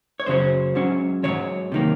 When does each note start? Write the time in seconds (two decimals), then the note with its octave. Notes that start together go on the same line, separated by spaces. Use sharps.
0.20 C#5
0.26 F#2 C#3 F#3 C#4 C5
0.75 G#2 F#3 C#4
1.23 D#3 F#3 C#5
1.28 G#2
1.72 C3 D#3 A#3